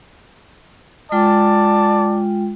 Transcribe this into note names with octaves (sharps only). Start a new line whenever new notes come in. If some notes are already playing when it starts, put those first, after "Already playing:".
G#3 F4 D5 G5 A5